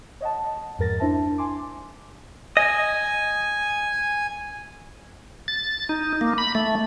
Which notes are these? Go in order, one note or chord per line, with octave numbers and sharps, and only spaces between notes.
C#5 D#5 F#5 A5
F2 G#2 A#4 A6 A#6
D4 E4 C5 E5 A5
G#5 C6 D6
D#5 G#5
A6
D#4
A#3
B5
A3